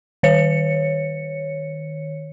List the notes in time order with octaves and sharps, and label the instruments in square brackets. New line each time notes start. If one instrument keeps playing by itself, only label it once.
[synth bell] D#3 C#5 C#7